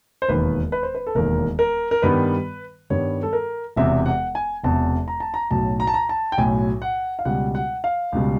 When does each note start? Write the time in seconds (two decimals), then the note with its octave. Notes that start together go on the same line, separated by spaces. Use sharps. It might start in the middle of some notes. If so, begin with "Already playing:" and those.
0.22 C5
0.29 E1 D#2 D#3 B4
0.72 B4
0.83 C5
0.95 B4
1.07 A4
1.15 E1 D#2 D#3 A#4
1.59 A#4
1.91 A#4
2.02 G2 D#3 G3 B3 B4
2.90 G2 D#3 G3 B3 C#5
3.23 A4
3.33 A#4
3.76 E1 E2 C3 E5
4.06 F#5
4.35 G#5
4.63 E1 E2 C3 A5
5.08 A#5
5.20 A5
5.34 A#5
5.51 B1 A2 F#3 A5
5.80 A#5
5.87 A5
5.94 A#5
6.09 A5
6.32 G5
6.38 B1 A2 F#3 G#5
6.82 F#5
7.19 F5
7.25 C#2 B2 G3 F#5
7.55 F#5
7.84 F5
8.12 C#2 B2 G3